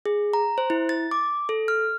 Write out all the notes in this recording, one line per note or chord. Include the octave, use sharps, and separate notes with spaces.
G#4
A#5
C5
E4
A6
D6
A4
F6